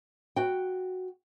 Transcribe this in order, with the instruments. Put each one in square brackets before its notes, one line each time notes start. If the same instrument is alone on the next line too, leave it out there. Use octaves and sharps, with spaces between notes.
[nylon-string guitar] F#4 G5